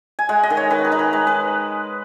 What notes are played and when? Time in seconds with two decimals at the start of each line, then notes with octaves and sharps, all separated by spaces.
0.19 G#5
0.29 G#3 F#5
0.43 D#5
0.50 D#3
0.57 C#5
0.70 D#3 B4
0.85 A#4
0.92 D#4 B4
0.99 A#4
1.13 G#3 B4
1.27 B4